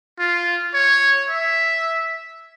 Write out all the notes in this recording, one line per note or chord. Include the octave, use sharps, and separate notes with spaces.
F4
C#5
E5